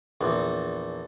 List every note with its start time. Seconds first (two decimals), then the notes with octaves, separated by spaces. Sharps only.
0.21 A#1 E2